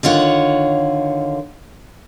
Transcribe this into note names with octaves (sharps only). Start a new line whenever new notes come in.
D3 D#3 F4 C#5 F#5